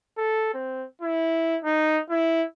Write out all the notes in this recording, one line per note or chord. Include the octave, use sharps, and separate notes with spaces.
A4
C4
E4
D#4
E4